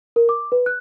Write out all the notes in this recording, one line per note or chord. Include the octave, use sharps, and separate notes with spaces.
A#4
D6
B4
F#6